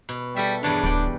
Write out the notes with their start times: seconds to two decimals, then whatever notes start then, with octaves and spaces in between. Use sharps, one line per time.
0.09 B2
0.36 G3 A4 E5
0.63 E2 G2 D4 C#5
0.84 D1 D5 G5